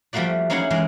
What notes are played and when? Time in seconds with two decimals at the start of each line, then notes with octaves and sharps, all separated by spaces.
0.13 F3 G3 A3 A#3 F#4 D5
0.50 A#3 C#4 D#4 E4 G#4 F#5
0.70 E3 G#3 A#4